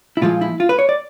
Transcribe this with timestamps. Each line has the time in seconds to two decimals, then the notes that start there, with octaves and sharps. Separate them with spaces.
0.17 E4
0.22 A#2 F3 G#3 F4
0.41 E4
0.60 F4
0.69 B4
0.79 C#5
0.89 D5